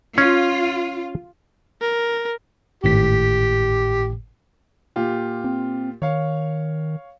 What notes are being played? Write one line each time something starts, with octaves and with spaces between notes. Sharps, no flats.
C#4 F4
A#4
G#1 A2 G4 B6
A#2 F4 G4
C4
D#3 C#5 F5